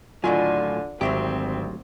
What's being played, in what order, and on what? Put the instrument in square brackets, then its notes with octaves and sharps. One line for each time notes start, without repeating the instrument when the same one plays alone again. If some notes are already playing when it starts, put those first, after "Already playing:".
[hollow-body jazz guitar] D#2 A2 F#3 [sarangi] D3 [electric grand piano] F4 G#5
[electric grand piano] G#1 E5 [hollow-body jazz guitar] D2 F#3 G4 [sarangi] C4